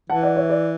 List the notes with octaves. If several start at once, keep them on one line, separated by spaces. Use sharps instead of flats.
E3 F#5 A5
D5 F#5
C#5 E5
B4 D5